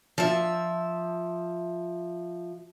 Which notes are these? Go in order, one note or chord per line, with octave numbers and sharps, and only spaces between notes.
F3 E5